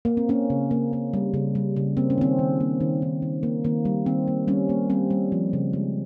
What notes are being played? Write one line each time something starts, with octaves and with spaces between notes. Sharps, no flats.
A#3
C4
A#3 C#4
C#3
A#3
A#3
G3
C#3
G3
C#3
A#3 C4
C#4
D#3 C4
D#3
A#3
D#3
D#3
D#3
A#3
D#3 A#3
G3
D#3 C4
A#3
G3 C#4
A#3
G3 C4
G3
F3
C#3
G#3